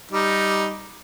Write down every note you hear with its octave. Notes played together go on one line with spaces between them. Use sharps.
G3 D#4